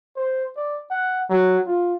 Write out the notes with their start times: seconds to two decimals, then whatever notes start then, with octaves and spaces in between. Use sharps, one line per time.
0.16 C5
0.56 D5
0.90 F#5
1.30 F#3
1.66 F4